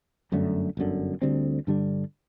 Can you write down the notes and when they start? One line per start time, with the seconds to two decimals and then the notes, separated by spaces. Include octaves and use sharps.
0.32 G1 F#2 D3 A3
0.77 G1 F#2 D3
1.22 D2 D3 G3 C4
1.67 G2 D3 G3 D4